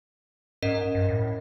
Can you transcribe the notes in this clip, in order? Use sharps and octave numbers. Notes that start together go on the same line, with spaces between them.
G#2 C#4 A#4 D#5
G2
A2